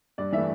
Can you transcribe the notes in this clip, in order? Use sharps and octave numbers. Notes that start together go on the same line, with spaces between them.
G2 D5
E3 A3 E5